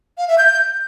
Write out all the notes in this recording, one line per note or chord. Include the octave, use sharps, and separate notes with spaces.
F5
E5
G6